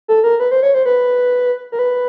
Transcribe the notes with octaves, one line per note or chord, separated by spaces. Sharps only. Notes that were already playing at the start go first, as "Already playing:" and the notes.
A4
A#4
B4
C5
C#5
C5
B4
A#4
B4